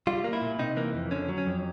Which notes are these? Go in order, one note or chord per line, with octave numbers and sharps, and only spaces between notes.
G3 F4
A#3
E4
A#2
C3 D#4
E3 A#3
F2
D3 C#4
F#3
C#4
F2